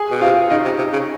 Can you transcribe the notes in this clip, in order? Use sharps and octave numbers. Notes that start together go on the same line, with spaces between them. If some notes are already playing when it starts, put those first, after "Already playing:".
Already playing: G#4 G#5
B2
C3 F4 F5
C#3 D#4 D#5
C3
C3
C#3